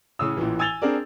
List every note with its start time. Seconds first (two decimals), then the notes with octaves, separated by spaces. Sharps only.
0.19 A2 C#3 C#4 D#6 E6
0.37 A1 A#2 E3
0.59 G#5 E6 G#6 A6 F7 G7
0.82 C4 D4 G#4 A#4 D5